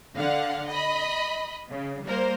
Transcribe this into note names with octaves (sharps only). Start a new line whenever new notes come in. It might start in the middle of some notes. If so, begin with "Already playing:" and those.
D3 F5 F#5
D#5 B5
C#3
G3 A#3 A#4 C5